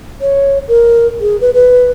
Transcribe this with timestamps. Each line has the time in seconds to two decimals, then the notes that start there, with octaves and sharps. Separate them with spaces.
0.21 C#5
0.68 A#4
1.21 G#4
1.41 B4
1.54 B4